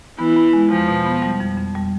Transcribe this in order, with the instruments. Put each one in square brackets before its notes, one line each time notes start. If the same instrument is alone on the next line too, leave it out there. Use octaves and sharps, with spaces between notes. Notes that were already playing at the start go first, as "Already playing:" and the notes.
[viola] E3 [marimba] B3
[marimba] B3
G#3
[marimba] E2 [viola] F3
[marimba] B2
B3
G3
F2
F2
G3